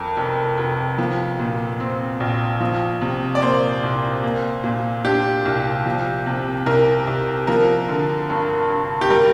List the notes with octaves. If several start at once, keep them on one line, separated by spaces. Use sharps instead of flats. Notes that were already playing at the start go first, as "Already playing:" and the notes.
Already playing: F2 A#4
F1
F1
F3
A#2
C4
A#1
F3
C3
D5
A#3 C5
C2
A#3
A#2
D4 G4
C2
F3
C3
C2 A#4
C2
F3 A#4
D3
G2
G2
G4
G3 A#4